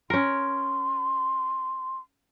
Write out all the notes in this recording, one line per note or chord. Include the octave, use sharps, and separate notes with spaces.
C#4 A#4 C6